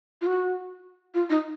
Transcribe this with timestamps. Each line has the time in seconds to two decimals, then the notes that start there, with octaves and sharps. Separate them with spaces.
0.21 F4
0.26 F#4
1.14 F4
1.30 D#4